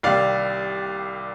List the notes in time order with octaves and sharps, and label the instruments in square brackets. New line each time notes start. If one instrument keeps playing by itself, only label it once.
[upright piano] C2 C3 D#3 G3 D5 F5